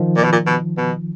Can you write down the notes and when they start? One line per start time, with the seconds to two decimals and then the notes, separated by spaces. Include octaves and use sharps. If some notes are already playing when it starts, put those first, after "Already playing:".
Already playing: D#3 F3
0.16 A#2
0.24 B2
0.32 A#2
0.47 B2
0.77 B2